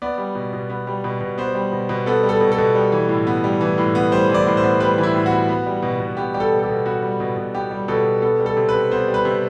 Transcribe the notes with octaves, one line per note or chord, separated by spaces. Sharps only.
B3 D5
G3
B2
B2
B3
G3
B2
B2
B3 C5
G3
B2
B2
B3 A4
G3
A4
B2
A4
B2
G3
E3
A2
B3
G3
E3
A2
B3
G3 C5
E3
D5
A2
C5
B3
G3 B4
E3
E4
A2
F#4
B3
B3
G3
B2
B2
B3 G4
G3 G4
A4
B2
A4
G4
B2
B3 F#4
G3
B2
B2
B3 G4
G3
B2 A4
B2
B3 A4
G3
A4
C3
B4
C3
B3 C5
G3
B4
C3